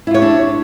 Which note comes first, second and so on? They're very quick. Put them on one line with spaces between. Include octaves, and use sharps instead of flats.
E4 F4 C#5 G4 D4